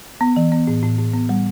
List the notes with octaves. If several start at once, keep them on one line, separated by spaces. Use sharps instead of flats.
B3
E3
B3
A2
A2
A2
B3
G3